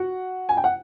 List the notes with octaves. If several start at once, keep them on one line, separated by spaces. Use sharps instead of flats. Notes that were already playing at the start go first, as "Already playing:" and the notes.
Already playing: F#4 F#5
G#5
G5
F#5